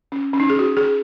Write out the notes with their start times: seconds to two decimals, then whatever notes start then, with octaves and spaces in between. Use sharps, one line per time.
0.12 C#4
0.33 C#4
0.40 D#4
0.50 G#4
0.59 F#4
0.77 G#4